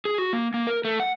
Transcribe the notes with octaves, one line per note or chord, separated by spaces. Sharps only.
G#4
F#4
A#3
A#3
A#4
A3
F#5